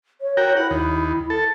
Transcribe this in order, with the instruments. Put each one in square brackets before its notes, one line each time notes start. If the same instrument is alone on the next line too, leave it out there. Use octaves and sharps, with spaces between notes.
[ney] C#5
[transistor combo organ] F#4 A#4 G5
[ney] E4 [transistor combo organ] F#5
[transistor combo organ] D#2
A4